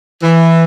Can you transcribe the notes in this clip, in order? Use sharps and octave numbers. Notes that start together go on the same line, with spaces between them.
E3